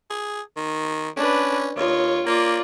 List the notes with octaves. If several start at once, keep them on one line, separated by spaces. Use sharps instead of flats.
G#4
D#3
C#4 D4 B4
D#2 F4 C#5
A#3 F4 D5